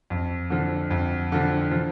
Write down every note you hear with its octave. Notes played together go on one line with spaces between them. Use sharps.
F2
D3 F3
F2
D3 F3
F3